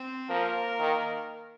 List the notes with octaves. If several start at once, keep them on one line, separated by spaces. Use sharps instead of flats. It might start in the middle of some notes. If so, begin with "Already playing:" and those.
Already playing: C4
F3 A#3 A#4
D#3